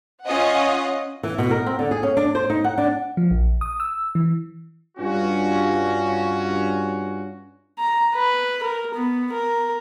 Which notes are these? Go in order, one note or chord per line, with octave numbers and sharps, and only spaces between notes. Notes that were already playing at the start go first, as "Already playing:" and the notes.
C#4 F4 D#5 F#5
E3
B2
A#4
C4
D3
G#4
C#4
D4
C5
D#4
F#5
D4
F3
A#1
D#6
E6
E3
G2 C#4 F4 F#4
A#5
B4
A#4
B3
A#4